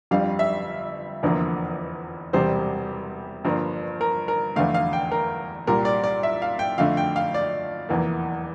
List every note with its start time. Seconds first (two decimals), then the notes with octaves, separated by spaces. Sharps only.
0.11 G1 F2 D3 G3 F5
0.39 E5
1.23 F1 E2 D3 F3 A#3
2.33 E1 E2 C3 G3 C5
3.45 G1 G2 F3 A#3
4.01 A#4
4.28 A#4
4.56 F1 E2 D3 A3 F5
4.74 F5
4.93 G5
5.12 A#4
5.67 C2 A#2 G3 A#4
5.85 D5
6.04 D5
6.23 E5
6.42 F5
6.59 G5
6.78 F2 D3 A3 F5
6.97 G5
7.16 F5
7.34 D5
7.89 F1 E2 E3 A#3